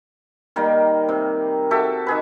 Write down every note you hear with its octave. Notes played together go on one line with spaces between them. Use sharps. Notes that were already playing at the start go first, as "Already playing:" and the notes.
D#3 G3 A#3
C3
F#4 G4 A4 E5
D#3 G#4 B4